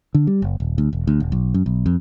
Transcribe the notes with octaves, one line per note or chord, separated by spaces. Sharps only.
D3
G3
F#1
D#1
D2
E1
D2
D#1
B1
F#2
B1
F2